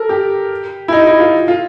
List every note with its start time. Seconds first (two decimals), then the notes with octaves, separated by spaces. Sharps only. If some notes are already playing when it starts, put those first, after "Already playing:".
Already playing: A4 A#4
0.09 G4
0.88 E4
0.93 D#4
1.07 E4
1.20 F4
1.48 F4